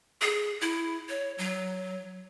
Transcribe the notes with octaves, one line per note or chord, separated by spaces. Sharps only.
G#4
E4
C#5
F#3